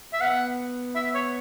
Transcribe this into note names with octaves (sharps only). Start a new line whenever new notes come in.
E5
B3 F#5
E5
C#5